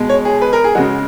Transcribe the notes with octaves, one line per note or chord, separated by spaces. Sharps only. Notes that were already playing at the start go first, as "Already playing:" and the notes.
Already playing: B2 G#3
C#5
G#4
B4
A#4
G#4
C#3 G#3 F#4